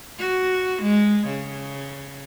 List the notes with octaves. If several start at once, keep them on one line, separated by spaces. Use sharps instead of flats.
F#4
G#3
C#3